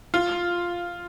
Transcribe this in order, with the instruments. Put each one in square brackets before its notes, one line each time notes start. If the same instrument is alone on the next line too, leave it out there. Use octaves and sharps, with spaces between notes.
[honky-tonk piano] F4